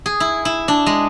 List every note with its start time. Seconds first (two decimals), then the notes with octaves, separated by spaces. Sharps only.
0.06 G#4
0.20 E4
0.45 E4
0.68 D4
0.86 G#3